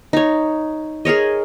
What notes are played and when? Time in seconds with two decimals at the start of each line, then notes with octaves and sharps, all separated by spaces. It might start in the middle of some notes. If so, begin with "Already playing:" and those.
0.13 D#4 C#5
1.05 G#4 A#4 C#5 D#5